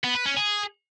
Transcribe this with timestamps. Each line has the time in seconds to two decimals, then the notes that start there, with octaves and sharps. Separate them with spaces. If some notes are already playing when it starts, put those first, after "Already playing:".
0.04 B3
0.15 B4
0.26 C#4
0.37 G#4